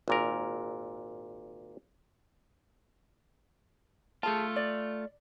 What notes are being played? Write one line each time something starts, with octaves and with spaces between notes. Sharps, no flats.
G#1 A#2 A#4
A3 F4 G#4 A5
D5